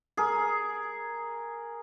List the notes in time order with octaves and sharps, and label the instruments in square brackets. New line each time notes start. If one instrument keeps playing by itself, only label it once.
[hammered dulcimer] G#4 A#4